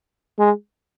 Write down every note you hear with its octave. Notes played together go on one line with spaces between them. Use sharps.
G#3